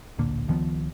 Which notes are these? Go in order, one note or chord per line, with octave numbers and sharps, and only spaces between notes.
D1 A#1 D3 A#3
C#2 D#3 F3 B3